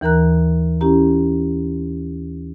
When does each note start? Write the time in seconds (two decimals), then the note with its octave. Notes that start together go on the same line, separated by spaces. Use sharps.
0.01 D#2 E3 A#4 A#5 F#6
0.81 C#4 E4 G4 A#5